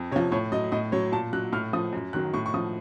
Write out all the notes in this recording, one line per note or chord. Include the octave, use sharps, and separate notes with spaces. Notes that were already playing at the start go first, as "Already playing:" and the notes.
Already playing: F2
C3 F3 C#5
A2 C#5
F#3 D#5
A2 D#5
F#3 C#5
A#2 A5
F#3 F#6
A2 F6
F3 D#6
F#2
D#3 F#3 F#6
A2 C#6
C#6
F3 D#6